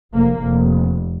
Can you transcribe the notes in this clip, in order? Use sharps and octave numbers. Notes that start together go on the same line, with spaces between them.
F1 A#3
F1